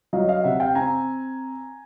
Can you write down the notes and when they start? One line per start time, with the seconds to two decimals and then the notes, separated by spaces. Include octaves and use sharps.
0.13 F#3 D#5 F5
0.28 D#5 F5
0.44 C3 E5 F#5
0.60 F5 G5
0.75 C4 G#5 A#5